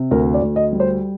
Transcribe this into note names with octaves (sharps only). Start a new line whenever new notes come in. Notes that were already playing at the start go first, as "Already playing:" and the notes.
Already playing: C3
D2 A#4
D5
D2
D#5
G3
C5